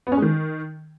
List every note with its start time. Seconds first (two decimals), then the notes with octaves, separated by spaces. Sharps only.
0.07 B3
0.12 C#4
0.17 G#3
0.22 D#3